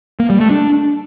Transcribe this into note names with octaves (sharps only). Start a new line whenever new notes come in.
A#3
G3
A3
D4